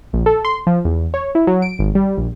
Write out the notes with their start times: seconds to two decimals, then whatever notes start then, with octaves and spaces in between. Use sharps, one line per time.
0.13 A#1
0.26 A4
0.45 C6
0.67 F3
0.85 E2
1.14 C#5
1.35 E4
1.47 F#3
1.62 D7
1.79 G#1
1.95 G3
2.17 A#1